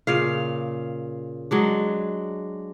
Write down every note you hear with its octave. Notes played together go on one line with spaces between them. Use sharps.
A#2 C#3 F5
F#3 G#3 D4